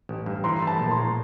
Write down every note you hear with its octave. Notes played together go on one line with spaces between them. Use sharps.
A1
G2
E3 A#5 C6
A3
A5 B5
A#1
A#5 C6
A2